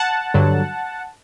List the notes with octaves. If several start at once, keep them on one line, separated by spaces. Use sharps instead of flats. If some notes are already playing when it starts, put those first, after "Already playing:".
Already playing: F#5 A5
G2 D3 F#3